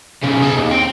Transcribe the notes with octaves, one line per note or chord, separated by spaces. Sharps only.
B1 C#3
G#4 A5
D#2
C4 G5